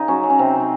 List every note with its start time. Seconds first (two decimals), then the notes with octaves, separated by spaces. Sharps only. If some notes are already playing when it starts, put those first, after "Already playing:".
Already playing: C#3 D#4
0.08 F#3 C#4
0.23 F#3
0.30 C#4
0.39 C3 C4
0.54 C3
0.60 D#4